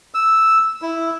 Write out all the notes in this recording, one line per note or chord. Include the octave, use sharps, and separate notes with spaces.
E6
E4